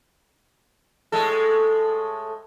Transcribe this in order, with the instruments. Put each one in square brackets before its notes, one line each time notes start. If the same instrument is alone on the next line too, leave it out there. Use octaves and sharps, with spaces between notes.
[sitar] A2 G#3 A4